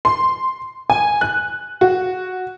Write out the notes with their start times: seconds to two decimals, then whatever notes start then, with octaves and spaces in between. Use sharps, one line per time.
0.05 C6
0.90 G#5
1.21 F#6
1.81 F#4